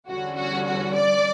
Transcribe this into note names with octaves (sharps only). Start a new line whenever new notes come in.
E2 D3 G3 C#4 F#4
F#4
F#4
D5